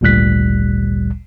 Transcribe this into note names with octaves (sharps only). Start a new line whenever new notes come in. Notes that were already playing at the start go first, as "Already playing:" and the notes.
G#1 D2 A#2 G3 F#6 B6